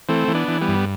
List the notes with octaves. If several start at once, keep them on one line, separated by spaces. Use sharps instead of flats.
E3 A3 C4
E3
B3 D4
E3
G3 B3
G2